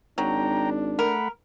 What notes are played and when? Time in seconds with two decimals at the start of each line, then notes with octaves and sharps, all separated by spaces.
0.18 G#1 F#3 D4 G5 A#5
0.99 A3 A#4 F#5 B5